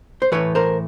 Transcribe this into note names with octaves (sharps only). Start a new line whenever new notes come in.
C5
A2 E3 B4 C#5
A#4 C5